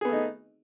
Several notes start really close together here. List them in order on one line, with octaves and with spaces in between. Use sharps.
G#4 B3 A3 D#4